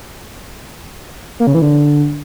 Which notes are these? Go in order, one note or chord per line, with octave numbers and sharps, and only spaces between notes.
A#3
C#3
E3
D3